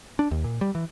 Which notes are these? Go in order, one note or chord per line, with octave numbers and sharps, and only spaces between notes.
D4
D#2
A#2
G3
E3